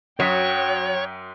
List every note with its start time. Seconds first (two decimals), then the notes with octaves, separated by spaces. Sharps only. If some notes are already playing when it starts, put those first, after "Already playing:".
0.20 F#2 F#3 C#5 G5 D#6 B6